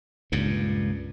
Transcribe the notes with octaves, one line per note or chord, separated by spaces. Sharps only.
C#2 G2 A#2